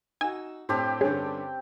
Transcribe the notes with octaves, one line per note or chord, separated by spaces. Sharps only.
D#4 F#4 G#5 E6
A2 C4 D4 G4
G2 D3 C#4 G#4 C#5